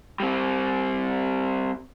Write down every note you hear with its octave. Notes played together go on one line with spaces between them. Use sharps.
G3 C4